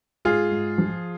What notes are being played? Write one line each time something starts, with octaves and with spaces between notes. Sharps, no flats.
G#2 F4 G#4
G#2
F3